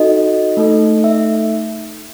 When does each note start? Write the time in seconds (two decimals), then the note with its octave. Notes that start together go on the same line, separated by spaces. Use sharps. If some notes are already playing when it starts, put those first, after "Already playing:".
Already playing: D#4 F#4 A4 D#5
0.57 A3 D#4 A4
1.04 E5